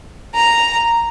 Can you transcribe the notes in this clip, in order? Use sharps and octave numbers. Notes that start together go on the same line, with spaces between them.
A#5